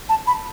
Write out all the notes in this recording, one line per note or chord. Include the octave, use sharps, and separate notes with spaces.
A5
B5